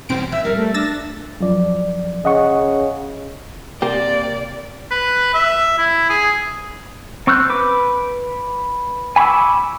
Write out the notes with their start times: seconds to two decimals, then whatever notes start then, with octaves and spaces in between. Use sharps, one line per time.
0.09 E1 G2 C#3 C4 D7
0.32 A#1 A2 E5
0.45 G3 A#4
0.57 A3
0.74 D4 E6 A6 A#6
1.40 F#2 F3 D5
2.25 C#3 D#5 F#5 C#6
3.82 C3 A#3 G4 D5
4.91 B4
5.34 E5
5.78 E4
6.09 G#4
7.27 C4 C#6 E6 F#6 G6
7.50 B4 D6
9.16 G#5 B5 C#6 D6 E6